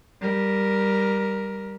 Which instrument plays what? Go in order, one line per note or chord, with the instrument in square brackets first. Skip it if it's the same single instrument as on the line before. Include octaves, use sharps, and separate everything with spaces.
[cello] G3 A#4